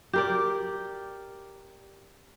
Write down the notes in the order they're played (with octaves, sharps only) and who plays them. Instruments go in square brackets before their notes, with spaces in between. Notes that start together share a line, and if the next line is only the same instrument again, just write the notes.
[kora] G4 A#4 D5